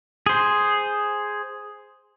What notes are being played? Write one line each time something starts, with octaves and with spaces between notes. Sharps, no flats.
G#4 C5